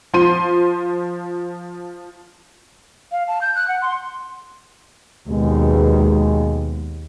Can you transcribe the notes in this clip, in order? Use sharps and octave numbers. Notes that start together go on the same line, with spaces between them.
F3 C6 D#7
F5
A5
G6
F#6
F#5
C6
D#2 B2 G#3